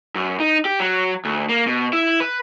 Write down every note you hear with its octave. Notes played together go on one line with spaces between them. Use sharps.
F#2
D#4
G4
F#3
D2
A#3
B2
E4
B4